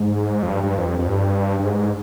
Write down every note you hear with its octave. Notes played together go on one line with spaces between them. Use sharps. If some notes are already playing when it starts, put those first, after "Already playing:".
Already playing: G#2
F2
G2
G2
F2
F2
G2
G2
G#2